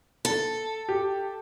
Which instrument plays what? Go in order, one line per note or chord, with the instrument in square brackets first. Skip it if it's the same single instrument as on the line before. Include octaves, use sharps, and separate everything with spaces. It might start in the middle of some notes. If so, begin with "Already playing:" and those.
[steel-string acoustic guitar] A4
[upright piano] G4